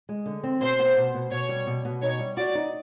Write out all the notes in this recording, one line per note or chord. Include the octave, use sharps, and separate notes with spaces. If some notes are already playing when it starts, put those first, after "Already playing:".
G#3
D3
C4
B2 C5
B3
B2
B2
B2 C#5
G3
B2
B2
D#4 C#5
G3
F#4 D5
D#4